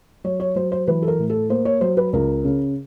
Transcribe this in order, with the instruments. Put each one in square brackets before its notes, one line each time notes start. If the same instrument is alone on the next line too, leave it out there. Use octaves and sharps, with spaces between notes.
[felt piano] F#3 C#5
C#5
F#3 C5
C5
E3 B4
A4
A#4
A2
A4
A#3 C5
C#5
F#3 C5
B4
C#2 A#4
C#3